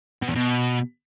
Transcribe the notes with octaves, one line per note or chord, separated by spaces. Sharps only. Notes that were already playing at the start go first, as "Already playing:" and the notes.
B2
E2
B2